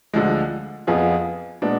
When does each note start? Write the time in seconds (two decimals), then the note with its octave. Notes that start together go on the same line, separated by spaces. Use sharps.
0.14 D2 D3 F3 G#3
0.87 F2 F3 B3 F4 G#4
1.62 A#2 G#3 B3 D4